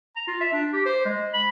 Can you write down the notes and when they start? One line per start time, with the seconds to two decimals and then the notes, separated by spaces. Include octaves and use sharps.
0.16 A#5
0.28 F4
0.41 E5
0.53 D4
0.73 G4
0.86 C5
1.05 G#3
1.34 B5